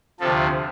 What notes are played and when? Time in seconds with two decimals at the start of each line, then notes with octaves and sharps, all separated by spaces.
0.20 D2 C3 F3 A4